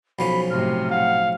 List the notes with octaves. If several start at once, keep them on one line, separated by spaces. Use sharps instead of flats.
B1 F3 C#4 B5
A2 C3 F6
F5 F#5